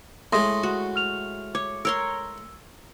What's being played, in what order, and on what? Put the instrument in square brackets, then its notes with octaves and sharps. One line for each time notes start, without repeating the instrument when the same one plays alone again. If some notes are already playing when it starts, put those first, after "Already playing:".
[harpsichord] A2 G#3 [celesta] C6 D#6 A#6
[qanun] F#4
[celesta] F6 F7
[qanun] C#5 [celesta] D6
[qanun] A#4 C#5 C6 [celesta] E6 G7